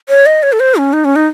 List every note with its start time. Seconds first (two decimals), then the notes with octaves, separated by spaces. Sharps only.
0.09 C#5
0.26 D#5
0.43 C#5
0.52 A4
0.60 C5
0.76 C#4
0.93 D#4
1.05 C#4
1.16 D#4